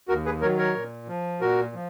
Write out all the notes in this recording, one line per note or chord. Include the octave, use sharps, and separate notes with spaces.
D#2 F#4 A#4
G#4 B4
D#3 F#3 A#4 C#5
A#4 C#5
A#2
F3
A#2 F#4 A#4
F3